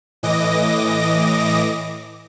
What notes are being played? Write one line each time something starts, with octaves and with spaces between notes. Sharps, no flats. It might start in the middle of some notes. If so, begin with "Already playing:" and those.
A2 E3 D#5 D6 A#6